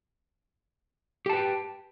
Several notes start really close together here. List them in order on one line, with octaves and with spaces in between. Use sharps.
G4 A5 B4 G5